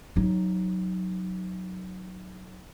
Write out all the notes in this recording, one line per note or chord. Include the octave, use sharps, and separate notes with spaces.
F#3 D#4